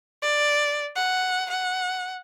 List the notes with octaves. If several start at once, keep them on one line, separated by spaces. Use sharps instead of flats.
D5
F#5
F#5